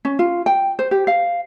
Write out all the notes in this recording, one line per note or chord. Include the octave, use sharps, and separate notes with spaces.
C#4
F4
G5
C5
G4
F5